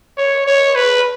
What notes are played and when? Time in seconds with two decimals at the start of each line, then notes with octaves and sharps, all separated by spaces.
0.18 C#5
0.47 C#5
0.75 B4